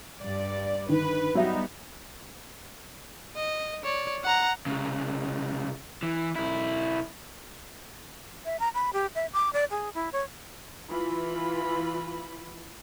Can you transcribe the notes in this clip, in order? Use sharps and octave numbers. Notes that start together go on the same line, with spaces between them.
G2 D5
D3 D#3 B4
F#3 G3 B3 D#4 E5
D#5
C#5 D5
F#5 A#5
C2 C#3
E3
B1 E4
E5
A#5
B5
G4
E5
D6
D5
G#4
E4
C#5
E3 F4 B5